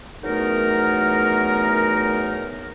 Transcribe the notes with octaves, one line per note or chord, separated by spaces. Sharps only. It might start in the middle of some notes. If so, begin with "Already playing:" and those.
E2 F#3 A3 B3 D#4 A#4